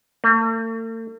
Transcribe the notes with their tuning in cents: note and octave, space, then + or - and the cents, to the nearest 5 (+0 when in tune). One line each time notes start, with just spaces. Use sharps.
A3 +45